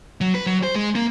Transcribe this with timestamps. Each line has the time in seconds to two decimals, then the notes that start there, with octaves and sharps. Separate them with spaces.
0.21 F#3
0.35 B4
0.46 F#3
0.63 C5
0.75 G#3
0.95 A#3